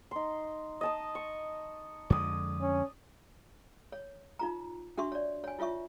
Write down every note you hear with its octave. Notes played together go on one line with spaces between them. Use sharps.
D#4 C6
D#5 A5 D#6
C#6
F2 D3 G#3 D5 D#6
C#4
C#5
D#4 F4 A#5
D4 F#4 E5 C6 C#6
C#5 D5
C#5 G#5
E4 F4 C#5 E5 C#6